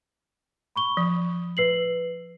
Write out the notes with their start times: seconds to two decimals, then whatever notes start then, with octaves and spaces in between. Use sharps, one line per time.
0.76 B5 C#6 G7
0.97 F3
1.57 B4 C7 F#7